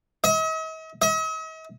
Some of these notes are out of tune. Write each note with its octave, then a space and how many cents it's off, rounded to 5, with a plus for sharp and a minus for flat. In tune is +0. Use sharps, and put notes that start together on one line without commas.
D#5 +45
D#5 +45